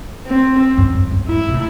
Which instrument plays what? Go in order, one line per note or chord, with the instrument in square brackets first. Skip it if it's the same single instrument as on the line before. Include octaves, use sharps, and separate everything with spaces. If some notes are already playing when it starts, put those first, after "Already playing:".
[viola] C4
[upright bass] F#2
F#2
F#2
[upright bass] G#2 [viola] E4
[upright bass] C3
A2